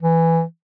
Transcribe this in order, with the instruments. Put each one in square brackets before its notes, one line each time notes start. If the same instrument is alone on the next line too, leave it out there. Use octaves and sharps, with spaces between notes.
[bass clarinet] E3